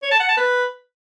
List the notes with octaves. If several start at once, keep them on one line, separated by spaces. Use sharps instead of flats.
C#5
A5
F#5
A5
B4